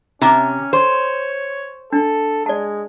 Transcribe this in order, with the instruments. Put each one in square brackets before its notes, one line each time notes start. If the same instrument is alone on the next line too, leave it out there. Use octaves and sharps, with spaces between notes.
[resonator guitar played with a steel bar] C3 [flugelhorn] C#4 [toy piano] D#4 A#5 D6
[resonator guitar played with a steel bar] C5 [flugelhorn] C#5
[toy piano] D4 [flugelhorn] A4
[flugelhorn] G#3 [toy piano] D5 A5